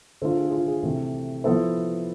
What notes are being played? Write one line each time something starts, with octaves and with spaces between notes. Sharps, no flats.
D3 A3 D4 F4 A4 C5
G#4
G#4
F4
G#4
C3 E3 A3 E4
F3 B3 E4 A4 C5